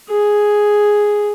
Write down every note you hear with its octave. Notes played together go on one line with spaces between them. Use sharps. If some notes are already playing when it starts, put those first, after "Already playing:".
G#4